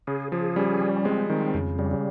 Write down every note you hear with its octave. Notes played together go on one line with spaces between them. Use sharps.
C#3 G#4
F3 G#4
G3 C#4
G3
G#3 C4
D#3 C4
F2 C#3
C#3 G3
C#3